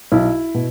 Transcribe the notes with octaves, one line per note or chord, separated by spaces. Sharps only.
B1 E4
B2